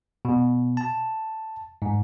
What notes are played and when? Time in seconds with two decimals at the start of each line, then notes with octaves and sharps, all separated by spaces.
0.25 B2
0.77 A5
1.82 G#2